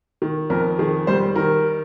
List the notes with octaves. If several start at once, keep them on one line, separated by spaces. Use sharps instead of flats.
D#3
F2 A#4
D#3 G#4
G3 C5
D#3 A#4